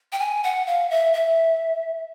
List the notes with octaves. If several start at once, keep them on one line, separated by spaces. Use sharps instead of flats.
G5
G#5
F#5
F5
E5
E5